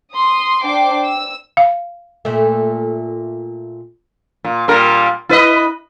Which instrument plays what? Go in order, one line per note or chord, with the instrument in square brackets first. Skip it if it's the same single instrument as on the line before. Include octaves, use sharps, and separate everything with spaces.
[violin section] C6 D#6
D4 C5 G5 D6 C7
E6
[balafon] F5
[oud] A#2 A3
[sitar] A#2
A#2 G3 A#4
E4 B4 D#5